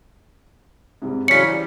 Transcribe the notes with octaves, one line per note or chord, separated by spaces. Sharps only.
G#2 C3 G3
C#3 E3 F#3 C#4 C5 D5 B6 C#7
G3